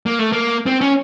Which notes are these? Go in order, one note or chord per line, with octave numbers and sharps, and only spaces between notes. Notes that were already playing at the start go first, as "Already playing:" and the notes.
A#3
A3
A#3
C4
C#4